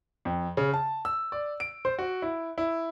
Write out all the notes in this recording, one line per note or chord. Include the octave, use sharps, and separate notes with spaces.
F2
C#3
A5
E6
D5
D7
C5
F#4
E4
E4